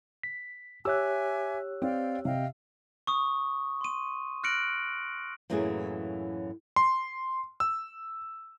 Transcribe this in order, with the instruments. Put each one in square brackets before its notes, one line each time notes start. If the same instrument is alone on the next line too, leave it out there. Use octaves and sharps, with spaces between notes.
[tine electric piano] B6
[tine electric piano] G4 C#5 F#6 [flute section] E5 G#5 D6 [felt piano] E6
[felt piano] C4 [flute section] D5 F5 G5
[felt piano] C3 [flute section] D#5 F5 G5
[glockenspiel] C#6 D#6
C6 D#7
F6 F#6 A#6 C#7 D7 F#7
[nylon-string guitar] F#2 A2 E3 F#3 A#3 G#4
[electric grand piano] C6
E6